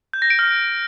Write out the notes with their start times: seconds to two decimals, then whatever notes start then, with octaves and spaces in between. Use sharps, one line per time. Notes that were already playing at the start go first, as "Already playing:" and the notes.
0.13 G6
0.22 A#6
0.30 D7
0.39 F6